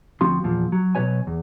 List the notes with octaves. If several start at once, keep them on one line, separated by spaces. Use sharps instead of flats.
D2 F3 C4 F#4 C6
E2 A#2 F3
F#3
B2 F#3 A#3 B4 C#5 G#5
E2